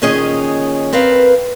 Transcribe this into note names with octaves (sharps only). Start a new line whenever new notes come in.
A#2 D#3 C#4 G#4 C#5 D#5
C4 A#4 B4 F5